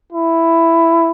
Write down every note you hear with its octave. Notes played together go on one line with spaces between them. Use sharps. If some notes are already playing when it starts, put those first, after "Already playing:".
E4